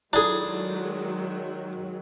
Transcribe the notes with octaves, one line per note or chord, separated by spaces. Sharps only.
D#3 F#3 G#3 D4 E4 F4 G#4 A4